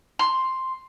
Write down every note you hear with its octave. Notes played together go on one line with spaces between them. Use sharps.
C6